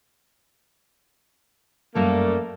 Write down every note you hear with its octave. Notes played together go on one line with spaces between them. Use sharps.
F#2 G3 A3 A#3